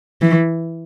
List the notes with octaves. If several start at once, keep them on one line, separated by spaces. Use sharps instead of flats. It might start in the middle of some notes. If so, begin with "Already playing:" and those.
E3